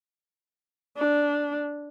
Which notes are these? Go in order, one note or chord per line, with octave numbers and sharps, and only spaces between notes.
D4